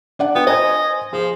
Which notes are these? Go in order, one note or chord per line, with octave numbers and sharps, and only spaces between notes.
D4 D5 F#5
B3 F4 G5
C5 D#5 G#5 G#6
F3 G#4